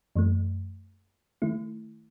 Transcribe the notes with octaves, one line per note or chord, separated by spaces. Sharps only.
F#2 E3 A3
D#3 A3 E4